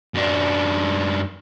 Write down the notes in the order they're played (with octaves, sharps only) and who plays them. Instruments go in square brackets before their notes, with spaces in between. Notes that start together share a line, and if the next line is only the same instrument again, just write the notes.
[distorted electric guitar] F#2 D4